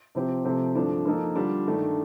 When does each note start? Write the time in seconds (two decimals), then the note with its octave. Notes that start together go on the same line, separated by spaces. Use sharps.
0.15 C3 F3 C4 G4
0.45 C3 F3 A3 C4
0.75 G2 D3 F3 A3 D4
1.05 F3 A#3 D#4 A4
1.35 D3 G3 D4 F4
1.66 G2 D#3 A3 D4